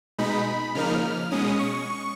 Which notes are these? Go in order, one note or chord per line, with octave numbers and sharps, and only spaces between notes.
B2 G#3 D#4 B5
C#3 F3 A#3 D#4 F6
B2 G#3 C#4 D#6
C#6